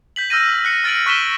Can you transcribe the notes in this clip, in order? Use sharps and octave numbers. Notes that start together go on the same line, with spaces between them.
G6 B6 F#7
E6 F6 G6 A#6 D#7
F#6 C#7
F6 A6 A#6 D7 D#7 F#7
C#6 F#6 B6 D#7 E7 G7